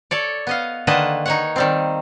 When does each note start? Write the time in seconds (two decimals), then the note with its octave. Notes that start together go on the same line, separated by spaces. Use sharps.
0.11 A4 C#5 D5
0.47 B3 D#5 F5
0.87 D3 D#3 A#3 B4 D#5 A5
1.26 D#4 C#5 F#5
1.56 D#3 G3 C4